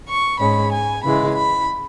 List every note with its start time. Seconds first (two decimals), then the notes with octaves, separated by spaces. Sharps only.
0.08 C#6
0.40 G#2 G#3 C#4 B5
0.72 G#5
1.04 C#3 E3 G#3 B5
1.35 B5